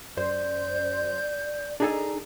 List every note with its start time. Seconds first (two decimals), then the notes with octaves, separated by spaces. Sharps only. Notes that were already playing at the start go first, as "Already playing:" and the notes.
0.17 F#2 C5 D5 G6
1.80 D4 D#4 G#4 A4 G#5 A#5